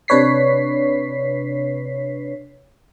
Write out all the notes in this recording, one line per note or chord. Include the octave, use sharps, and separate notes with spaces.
C3 D4 B4 C#5 B6 C7